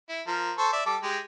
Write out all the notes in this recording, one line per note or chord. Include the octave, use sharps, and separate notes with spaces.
E4
F3 A#4
A4 C5 C#6
D5 E5
G3 A4 D6
G#3 G4